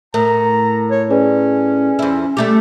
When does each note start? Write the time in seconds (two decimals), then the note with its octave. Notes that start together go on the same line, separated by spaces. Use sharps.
0.14 A2 A#4 A#5
0.91 C#5
1.10 C#4 G#4 B4 D5
1.99 F2 E4
2.37 G3 A3 G4